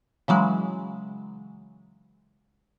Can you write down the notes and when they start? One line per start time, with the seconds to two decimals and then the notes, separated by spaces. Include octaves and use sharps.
0.28 C#3 E3 F#3 G#3